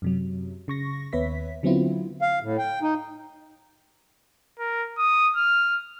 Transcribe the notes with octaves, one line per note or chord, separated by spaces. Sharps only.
F#2 C3 F#3
C#3 C#6 A#6
D#2 B3 B4 C#5 E5 B6
D3 F#3 B3 C4 E4 F4
F5
A2
G5
D#4
A#4
D#6
F6